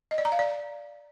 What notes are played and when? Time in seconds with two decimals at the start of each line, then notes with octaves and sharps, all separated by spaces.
0.11 D#5
0.18 D5
0.25 A#5
0.32 F5
0.39 D5